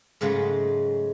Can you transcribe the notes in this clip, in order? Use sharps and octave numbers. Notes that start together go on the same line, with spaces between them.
G#2 C#3 F#3 G#3 A3